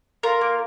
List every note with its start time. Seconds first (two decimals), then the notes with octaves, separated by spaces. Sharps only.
0.23 F4 A#4
0.41 A#3